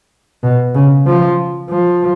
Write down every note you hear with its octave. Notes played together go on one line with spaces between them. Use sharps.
B2
C#3
F3
F3